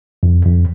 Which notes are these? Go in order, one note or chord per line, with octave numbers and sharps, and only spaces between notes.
F2
F2